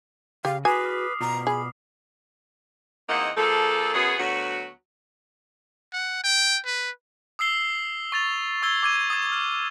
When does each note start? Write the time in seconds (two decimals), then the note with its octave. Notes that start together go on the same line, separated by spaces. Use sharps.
0.45 C#3 G4 F5
0.65 F#4 G#4 B4 G#5 D6 D#6 C7
0.85 F6 B6
1.21 B2 F4 A#5
1.47 G#4 B5
3.09 E2 A#3 C4 D#4 D#5 F#5
3.37 F3 A#3 G#4 A4
3.94 F#2 B3 F#4 G#4
4.19 D2 F#3 B3 F#4
5.93 F#5
6.24 G5
6.66 B4
7.39 D#6 E6 C7 G7
8.12 C#6 A6 F7
8.62 C#6 E6 G#6 G7
8.83 D6 G#6 D#7
9.10 D#6 G#6
9.32 F6